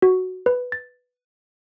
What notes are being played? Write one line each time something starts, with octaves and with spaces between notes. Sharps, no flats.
F#4
B4
A6